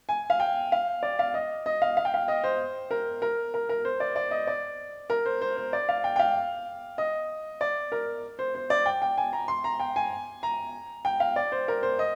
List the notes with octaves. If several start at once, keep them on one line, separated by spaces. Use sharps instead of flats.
G#5
F5
G5
F5
D5
F5
D#5
D#5
F5
F5
G5
F5
D#5
C5
A#4
A#4
A#4
A#4
C5
D5
D5
D#5
D5
A#4
C5
C5
C5
D5
F5
G5
G5
F5
D#5
D5
A#4
C5
C5
D5
G5
G5
G#5
A#5
C6
A#5
G5
G#5
A#5
G5
F5
D5
C5
A#4
C5
D#5